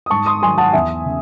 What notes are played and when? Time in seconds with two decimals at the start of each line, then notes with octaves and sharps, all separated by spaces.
0.06 D#6
0.10 G#2 A5 C#6
0.26 C6 D#6
0.42 D#3 F#3 G#5 C6
0.58 F#5 A5
0.73 E2 E5 G#5
1.05 C#3